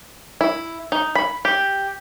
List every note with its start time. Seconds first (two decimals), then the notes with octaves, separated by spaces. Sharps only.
0.41 E4
0.92 D#4
1.15 B5
1.45 G4